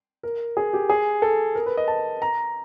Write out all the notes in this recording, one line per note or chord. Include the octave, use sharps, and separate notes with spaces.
A#4
G#4
G4
G#4
A4
A#4
B4
D#5
A5
A#5